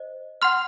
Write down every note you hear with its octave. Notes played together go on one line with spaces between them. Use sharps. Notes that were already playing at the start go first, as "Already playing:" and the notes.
Already playing: C5 D#5
F#5 C6 F6